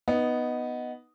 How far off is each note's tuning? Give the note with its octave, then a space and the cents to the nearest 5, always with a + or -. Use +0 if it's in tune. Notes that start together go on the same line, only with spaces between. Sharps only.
B3 +0 D#4 +0